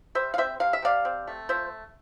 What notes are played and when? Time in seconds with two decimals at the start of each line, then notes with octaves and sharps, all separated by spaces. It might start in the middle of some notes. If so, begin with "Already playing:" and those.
0.15 G3 C5 E5
0.34 F5
0.38 C4 C5 E5
0.60 C3 F5
0.73 E5
0.82 C3 D5 F5
1.05 C4
1.27 A3
1.49 F3 C5 E5